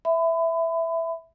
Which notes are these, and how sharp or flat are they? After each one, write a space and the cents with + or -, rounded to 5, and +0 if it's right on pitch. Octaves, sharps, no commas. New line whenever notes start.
E5 +0 B5 +30